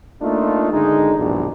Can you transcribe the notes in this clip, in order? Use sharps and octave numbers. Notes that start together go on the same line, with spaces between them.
A3 A#3 D4 D#4 F4
G#1 D3 G#3 D#4
A#1 E2 G2 B2 A3 D4